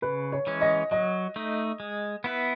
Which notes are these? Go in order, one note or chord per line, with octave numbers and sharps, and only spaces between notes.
C#3 B4
C#5
E3 G#3 C#4
D#5
F#3 D#5
A3 D#4
G#3
B3 E4 B4